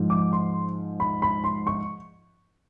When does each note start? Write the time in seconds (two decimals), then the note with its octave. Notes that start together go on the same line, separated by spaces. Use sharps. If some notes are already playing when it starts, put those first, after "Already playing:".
Already playing: G#2 F3
0.10 D6
0.33 C6
1.00 B5
1.22 B5
1.44 C6
1.67 C#6